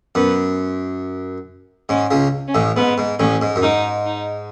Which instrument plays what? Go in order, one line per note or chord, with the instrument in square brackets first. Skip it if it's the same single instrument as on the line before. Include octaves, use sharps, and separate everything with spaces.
[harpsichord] F#2 [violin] B3
[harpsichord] G#2 [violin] C#4
[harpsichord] C#2 C#3
[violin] C#4
[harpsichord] A1 A2
[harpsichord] G#2 [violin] B3
[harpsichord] G#2
[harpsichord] A1 A2 [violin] C#4
[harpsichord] G#2
F#2
[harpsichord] G#2 [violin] D#4
[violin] D#4